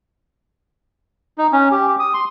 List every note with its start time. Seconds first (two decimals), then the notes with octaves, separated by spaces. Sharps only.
1.38 D#4
1.53 C#4
1.71 G4
1.88 G4
1.99 D#6
2.14 C6